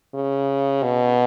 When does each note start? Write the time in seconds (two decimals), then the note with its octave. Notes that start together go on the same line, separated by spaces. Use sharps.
0.14 C#3
0.83 B2